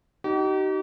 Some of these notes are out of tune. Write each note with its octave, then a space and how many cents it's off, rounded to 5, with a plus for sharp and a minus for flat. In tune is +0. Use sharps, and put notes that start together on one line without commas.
D#4 +0 G4 -45